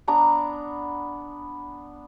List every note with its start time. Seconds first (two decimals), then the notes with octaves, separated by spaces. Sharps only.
0.08 B3 D4 A#5 D6